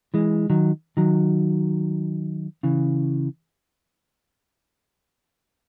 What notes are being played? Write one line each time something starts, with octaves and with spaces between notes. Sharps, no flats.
E3 G#3
D#3 F#3
D#3 F#3
C#3 E3